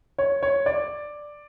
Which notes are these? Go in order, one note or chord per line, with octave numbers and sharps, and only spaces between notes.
C#5
C#5
D5